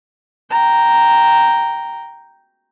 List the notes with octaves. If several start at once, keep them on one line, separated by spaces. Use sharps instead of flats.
G5 A#5